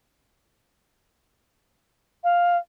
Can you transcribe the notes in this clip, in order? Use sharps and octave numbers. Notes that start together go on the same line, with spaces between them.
F5